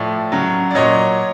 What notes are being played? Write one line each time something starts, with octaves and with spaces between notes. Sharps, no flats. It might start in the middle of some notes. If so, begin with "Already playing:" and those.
Already playing: A2 F3 D5 E5
C#3 F#3
D5
A#2 F#3 C#5 D#5